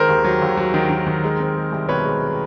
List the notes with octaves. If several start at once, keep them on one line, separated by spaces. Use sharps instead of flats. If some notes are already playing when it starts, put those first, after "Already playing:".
Already playing: D#3 G#3 A#4 C5
D#2
F#3
D#2
F#3
D#3
D#3
D#3
G#3
C4
G#3
C2
B2 B4 C#5
G#3
G#3